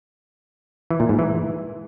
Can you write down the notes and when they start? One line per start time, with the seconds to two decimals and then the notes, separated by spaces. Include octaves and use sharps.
0.90 E3
1.00 A#2
1.09 G#2
1.19 E3